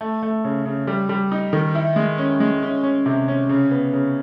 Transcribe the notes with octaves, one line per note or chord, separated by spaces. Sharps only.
A3
A3
C#3
C#3
G3
G3
D#4
D#3
E4
G#3
C#4
G#3
C#4
C#4
C3
C#4
C#3
B3
C#3